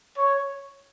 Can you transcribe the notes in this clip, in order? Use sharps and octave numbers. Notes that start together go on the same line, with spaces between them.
C#5